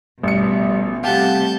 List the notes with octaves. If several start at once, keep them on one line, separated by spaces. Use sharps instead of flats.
A1 B2 F3 G3 C#7
C3 G3 A3 G4 F5 F#5 A5 G6